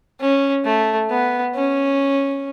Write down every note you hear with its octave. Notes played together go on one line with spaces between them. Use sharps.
C#4
A3
B3
C#4